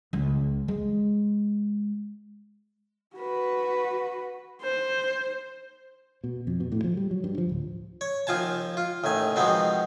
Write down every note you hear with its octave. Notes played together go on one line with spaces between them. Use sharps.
C#2
G#3
F#4 B4
C5
B2
F2
B2
A2
F3
G3
F#3
G2
F3
D1
C#5
D#2 F3 F4 G#5 A5
F4
A1 D#2 D#3 G#5
B2 D#3 F3 G#3 B3 C4